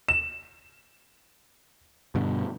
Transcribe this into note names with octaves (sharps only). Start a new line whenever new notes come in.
E7
G2 B2 D3